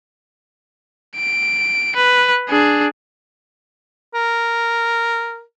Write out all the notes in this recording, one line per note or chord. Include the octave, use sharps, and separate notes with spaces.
D7
B4
D4 G#4
A#4